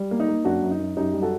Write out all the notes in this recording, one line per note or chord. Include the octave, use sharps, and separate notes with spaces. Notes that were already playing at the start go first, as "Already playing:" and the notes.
Already playing: G3
A#3
D#4
A#3
F#2 D4 F#4
F#2
D#4
F#2
F#2 D#4 G4
G3
F#4 A4